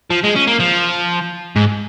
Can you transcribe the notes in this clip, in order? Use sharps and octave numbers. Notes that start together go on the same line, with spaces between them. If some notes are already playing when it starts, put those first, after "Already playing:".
F3
G#3
C#4
A#3
F3
G#2